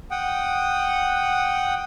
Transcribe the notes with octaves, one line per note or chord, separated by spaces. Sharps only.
F#5 G5 D#6